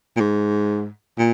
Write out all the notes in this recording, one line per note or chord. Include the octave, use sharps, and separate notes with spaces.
A#2
G#2
A#2